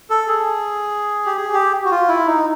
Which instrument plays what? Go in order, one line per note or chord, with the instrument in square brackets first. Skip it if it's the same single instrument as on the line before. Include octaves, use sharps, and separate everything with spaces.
[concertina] A4
G#4
G4
G#4
G4
F#4
F4
E4
D#4